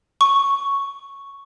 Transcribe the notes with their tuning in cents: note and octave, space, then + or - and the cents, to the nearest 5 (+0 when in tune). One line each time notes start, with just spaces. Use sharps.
C#6 +0